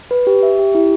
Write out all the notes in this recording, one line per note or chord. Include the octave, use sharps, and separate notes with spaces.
B4
G4
E5
G4
E4